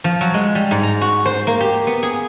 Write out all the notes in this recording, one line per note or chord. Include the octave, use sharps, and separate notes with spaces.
F3
F#3
G#3
G3
G#2
A#5
F#4
C5
A#3
G4
B3
G#4